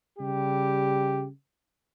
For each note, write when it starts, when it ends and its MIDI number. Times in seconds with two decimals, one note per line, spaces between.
0.19 1.26 49
0.19 1.26 55
0.19 1.26 67